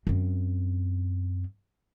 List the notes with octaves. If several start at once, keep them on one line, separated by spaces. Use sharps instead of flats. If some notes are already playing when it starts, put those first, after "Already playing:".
F#2 C4